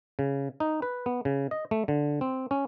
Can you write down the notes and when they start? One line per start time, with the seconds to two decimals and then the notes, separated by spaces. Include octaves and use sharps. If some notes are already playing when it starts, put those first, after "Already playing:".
0.19 C#3
0.60 D#4
0.82 B4
1.06 B3
1.25 C#3
1.51 D#5
1.71 A3
1.88 D3
2.21 C4
2.51 C#4